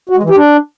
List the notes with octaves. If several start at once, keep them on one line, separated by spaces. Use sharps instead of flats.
F#4
G#3
E3
G4
D4